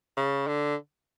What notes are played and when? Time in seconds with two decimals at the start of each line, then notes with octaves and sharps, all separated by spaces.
0.17 C#3
0.48 D3